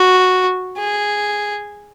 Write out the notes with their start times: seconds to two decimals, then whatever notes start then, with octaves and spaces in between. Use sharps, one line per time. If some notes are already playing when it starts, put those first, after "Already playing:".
Already playing: F#4
0.78 G#4